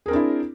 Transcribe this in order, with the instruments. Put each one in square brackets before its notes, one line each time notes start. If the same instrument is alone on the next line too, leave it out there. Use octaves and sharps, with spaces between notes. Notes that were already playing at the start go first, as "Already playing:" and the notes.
[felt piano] G#4
A#4
C4
D4
E4